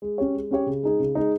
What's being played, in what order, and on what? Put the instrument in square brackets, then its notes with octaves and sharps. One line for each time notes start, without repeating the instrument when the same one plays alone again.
[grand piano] G#3
C#4 G4 C#5
G#3
C#4 G4 C#5
C#3
G#3 D#4 G#4
C#3
G#3 D#4 G#4